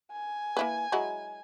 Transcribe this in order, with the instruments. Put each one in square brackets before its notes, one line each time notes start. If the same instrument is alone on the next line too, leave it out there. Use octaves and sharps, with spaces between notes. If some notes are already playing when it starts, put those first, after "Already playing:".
[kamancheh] G#5
[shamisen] A#3 E4 B4
F#3 G#3 E4